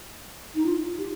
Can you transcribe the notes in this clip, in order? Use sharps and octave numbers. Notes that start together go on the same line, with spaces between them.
D#4
F4
G4